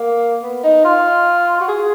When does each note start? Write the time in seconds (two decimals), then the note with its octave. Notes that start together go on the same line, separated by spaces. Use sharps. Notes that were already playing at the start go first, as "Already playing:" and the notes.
Already playing: A#3
0.43 B3
0.64 D#4
0.84 F4
1.61 F#4
1.68 G#4